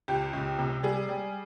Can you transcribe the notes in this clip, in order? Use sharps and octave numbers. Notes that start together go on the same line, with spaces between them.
C#2 G4
C#2
C3
G3 G#4
G3